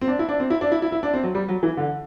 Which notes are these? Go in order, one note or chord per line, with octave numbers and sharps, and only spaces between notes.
C4
D4
E4
D4
C4
E4
D4
E4
E4
E4
D4
C4
F#3
G3
F#3
E3
D3